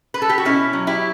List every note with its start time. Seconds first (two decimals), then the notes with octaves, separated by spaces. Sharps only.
0.14 B4
0.22 A4
0.29 G4
0.38 F#4
0.45 B2 C#4 E4
0.73 F#3
0.87 E4 G4